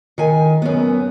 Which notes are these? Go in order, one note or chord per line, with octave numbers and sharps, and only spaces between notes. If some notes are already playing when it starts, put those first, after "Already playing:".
D#3 G#5
F#2 B3